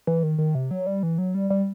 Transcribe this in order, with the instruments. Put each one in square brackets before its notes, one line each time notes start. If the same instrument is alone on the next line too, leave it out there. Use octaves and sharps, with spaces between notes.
[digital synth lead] E3
D#3
D#3
C3
F#3
G3
E3
F#3
G3
G3